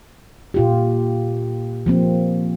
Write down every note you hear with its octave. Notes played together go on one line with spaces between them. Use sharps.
A#2 F4 G4
F3 A#3 C4